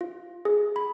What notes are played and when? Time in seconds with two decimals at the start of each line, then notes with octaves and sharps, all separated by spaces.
0.01 F4
0.45 G#4
0.76 B5